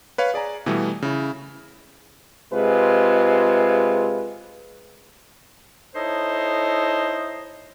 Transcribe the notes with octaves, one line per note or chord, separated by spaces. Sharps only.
B4 C#5 F5
G#4 D5 G#5 A#5
B2 E3 G3 A3 B3
C#3 E4
C3 G#3 F4 G#4 B4
D#4 E4 A4 C5 C#5 D#5